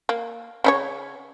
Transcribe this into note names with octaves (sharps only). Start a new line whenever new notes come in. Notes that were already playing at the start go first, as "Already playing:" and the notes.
A#3
C#3 D#4 C#5